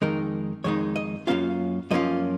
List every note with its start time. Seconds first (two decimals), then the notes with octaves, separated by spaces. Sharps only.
0.02 F2 D#3 G#3 D#4 A#4
0.64 F2 D#3 G#3 D#4 C#5
0.96 D#5
1.27 F#2 F3 A#3 C#4 F4 F5
1.91 F#2 F3 A#3 C#4 F4 D#5